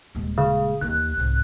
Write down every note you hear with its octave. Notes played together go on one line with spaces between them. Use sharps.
D#1 G#3
C#3
D#2 E3 F#6
C2 G#2